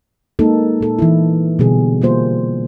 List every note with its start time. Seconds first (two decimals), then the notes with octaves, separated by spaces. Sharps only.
0.39 G#3 A#3 D#4 A4
0.80 A#2 A4
0.99 E3 D#4 E4
1.59 B2 D3 G3 G#4
2.02 G3 A#3 F4 C5